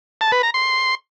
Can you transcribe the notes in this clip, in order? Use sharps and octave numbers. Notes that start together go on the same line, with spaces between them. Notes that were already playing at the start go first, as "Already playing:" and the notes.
A5
B4
A#5
C6